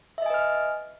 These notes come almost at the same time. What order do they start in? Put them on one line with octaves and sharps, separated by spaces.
E5 D#5 G#5 B4 F6